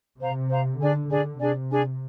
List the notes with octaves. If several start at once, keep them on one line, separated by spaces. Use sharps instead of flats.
C3 C5 F5 A#5
C5 F5 A#5
D3 D4 G#4 D5 G#5
D3 D4 G#4 D5 G#5
C3 D4 G#4 D5 G#5
D4 G#4 D5 G#5